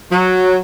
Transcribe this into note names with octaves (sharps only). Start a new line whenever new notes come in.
F#3